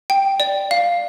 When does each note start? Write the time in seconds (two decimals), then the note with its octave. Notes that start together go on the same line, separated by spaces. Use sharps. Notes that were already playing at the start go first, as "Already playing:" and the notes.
0.10 G5
0.40 D5
0.71 F5